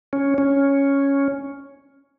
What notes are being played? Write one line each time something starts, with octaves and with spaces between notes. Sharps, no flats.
C#4
C#4